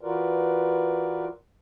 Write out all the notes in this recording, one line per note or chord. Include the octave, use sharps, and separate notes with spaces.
E3 F4 F#4 A#4 B4 D5